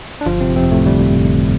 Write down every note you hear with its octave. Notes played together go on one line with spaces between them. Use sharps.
D4
G1 F3 F4
C3 C4
F2 C3 C4
A2 A3
D3 G3
G1